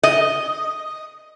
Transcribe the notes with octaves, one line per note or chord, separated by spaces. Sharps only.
D#5